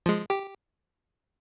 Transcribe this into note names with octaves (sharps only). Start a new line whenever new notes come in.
F3 G#3
G4